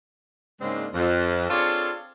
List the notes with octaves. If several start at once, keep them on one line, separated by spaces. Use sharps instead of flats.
G#2 C#3 G#3 A#3 C4 D4
F2
C4 D4 F4 G#4 A4 C#5